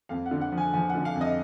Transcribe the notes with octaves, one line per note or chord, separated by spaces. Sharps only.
F2 F5
F#5
D3
F#5
F3
G#5
F3 G#5
F#5
D3
F5
F2
D#5